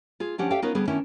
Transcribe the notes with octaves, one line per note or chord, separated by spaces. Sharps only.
F4 G#4
D2 F3 C#4 D4 G4 F#5
G4 A4 D5 E5 F5 G5
B3 C#4 D#4 F4 A#4 B4
D3 G3 B3 G#4
D#3 B3 C#4 D4 E4